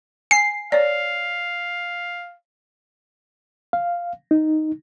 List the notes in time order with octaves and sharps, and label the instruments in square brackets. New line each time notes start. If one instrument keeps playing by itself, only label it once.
[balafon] G#5 [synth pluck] C7
[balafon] C#5 D5 [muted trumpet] F5
[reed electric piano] F5
D#4